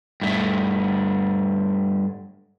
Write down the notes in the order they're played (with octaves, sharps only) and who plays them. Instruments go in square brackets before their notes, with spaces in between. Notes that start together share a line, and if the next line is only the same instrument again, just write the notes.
[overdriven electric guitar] G2 A3